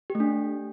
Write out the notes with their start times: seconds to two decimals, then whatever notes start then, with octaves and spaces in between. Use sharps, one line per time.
0.10 G4
0.15 A3
0.20 D4